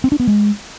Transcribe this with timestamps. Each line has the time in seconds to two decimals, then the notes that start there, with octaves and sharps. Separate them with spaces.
0.04 C4
0.12 D4
0.20 B3
0.27 G#3